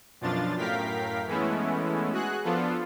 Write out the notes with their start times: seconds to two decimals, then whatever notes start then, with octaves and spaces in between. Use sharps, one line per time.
0.21 F#2 B2 F3 D4 F4 A6
0.58 F#2 A2 A#4 F5 G5 B6
1.27 E3 G#3 A3 B3 C#4 E4
2.12 F#4 G#4 F#6
2.44 F3 B3 D4 F4 A4